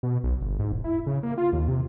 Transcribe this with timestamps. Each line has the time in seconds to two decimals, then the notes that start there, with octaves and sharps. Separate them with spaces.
0.03 B2
0.24 B1
0.41 G1
0.59 G#2
0.72 E1
0.84 E4
1.06 C#3
1.23 A#3
1.38 F4
1.53 D#2
1.68 C3